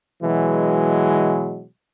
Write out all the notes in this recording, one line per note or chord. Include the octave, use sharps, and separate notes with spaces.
B2 E3 F#3 G#3